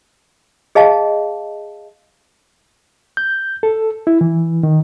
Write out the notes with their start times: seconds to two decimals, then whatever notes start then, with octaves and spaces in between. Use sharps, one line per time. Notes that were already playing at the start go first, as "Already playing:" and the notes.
0.75 G#4 D#5 F5 A5
3.17 G6
3.63 A4
4.07 E4
4.21 E3
4.63 D#3